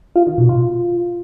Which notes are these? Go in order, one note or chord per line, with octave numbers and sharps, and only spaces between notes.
F4
D#3
B2
F4